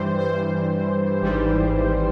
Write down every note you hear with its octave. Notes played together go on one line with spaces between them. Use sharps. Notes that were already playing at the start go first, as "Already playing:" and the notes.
Already playing: G2 E3 G3 C5
C5
G#1 G#2 E3 G3